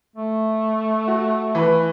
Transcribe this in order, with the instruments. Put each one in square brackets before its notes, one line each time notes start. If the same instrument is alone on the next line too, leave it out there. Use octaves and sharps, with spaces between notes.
[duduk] A3
[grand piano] F#4
E3 B4